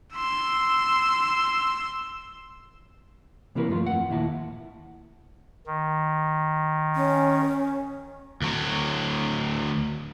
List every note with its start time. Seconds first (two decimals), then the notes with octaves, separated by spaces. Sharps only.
0.15 C6 E6
3.55 C3 E3 A#3 E4 A#4 B4
3.69 G2 F3 A3 F4 B5 C6
3.87 F2 F#5
4.09 D#2 A#2 E4 E5 A5
5.67 D#3
6.96 C#4
8.42 D2 F#3